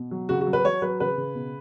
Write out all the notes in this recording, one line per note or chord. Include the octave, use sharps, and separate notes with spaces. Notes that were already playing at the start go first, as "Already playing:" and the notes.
Already playing: B2
F#3
C#3 F#4
F#4
F#3
B4
F#3 C#5
F#3 B4
C#3 B4
C#3
B2